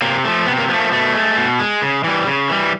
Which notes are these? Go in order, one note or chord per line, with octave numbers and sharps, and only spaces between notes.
C3 A#3
F3 A3
C3 B3
A#3
F3 B3
A3
A#3
B2 A3
G#3
B2
G#3
C#3
E3 G3
C#3
E3 G3